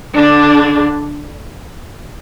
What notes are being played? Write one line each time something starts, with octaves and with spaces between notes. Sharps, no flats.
D3 D4